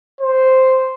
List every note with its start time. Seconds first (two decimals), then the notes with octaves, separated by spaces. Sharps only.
0.21 C5